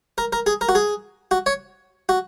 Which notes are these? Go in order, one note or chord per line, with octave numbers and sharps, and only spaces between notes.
A#4
A#4
G#4
A#4
F#4
G#4
F#4
C#5
F#4